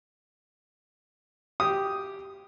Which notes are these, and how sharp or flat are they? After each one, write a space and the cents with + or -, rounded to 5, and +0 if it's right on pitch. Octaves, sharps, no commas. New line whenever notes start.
G4 +0 D#6 +0